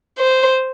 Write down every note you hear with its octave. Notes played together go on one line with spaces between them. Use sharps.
C5